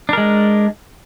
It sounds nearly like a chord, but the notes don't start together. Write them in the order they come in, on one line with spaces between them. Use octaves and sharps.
D4 A#4 G#3